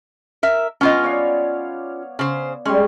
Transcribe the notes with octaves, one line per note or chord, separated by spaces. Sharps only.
A#4 E5
B3 C#4 F4 D#5
C#5 D5 F5
C#3 C5
G3 G#3 C#4